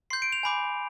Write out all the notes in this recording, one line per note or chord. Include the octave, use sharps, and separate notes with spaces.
C6 G6 C7
D7
F7
G#5 B5 D6 G6